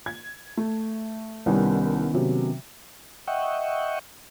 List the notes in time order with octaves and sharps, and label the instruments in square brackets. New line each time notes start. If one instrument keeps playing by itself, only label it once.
[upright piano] G#6
A3
[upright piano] C2 G3 [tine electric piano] D#3 B3 C#4
[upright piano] C3 F#3
[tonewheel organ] D#5 E5 F#5 G5 C#6